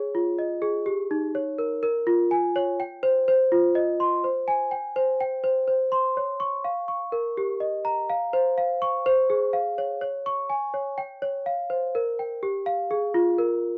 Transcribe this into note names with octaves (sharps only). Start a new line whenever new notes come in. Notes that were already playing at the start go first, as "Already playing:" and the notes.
Already playing: G#4 C#5
F4
D#5
G#4
G4
D#4
C#5
A#4
A#4
F4
G#5
C#5
G5
C5
C5
F4
D#5
C6
C5
G#5
G5
C5
G5
C5
C5
C6
C#5
C#6
F5
C#6
A#4
G4
D#5
A#5
F5
C5
F5
C#6
C5
G#4
F5
C#5
C#5
C#6
G#5
C#5
G5
C#5
F5
C5
A#4
G5
G4
F5
G#4
F4
A#4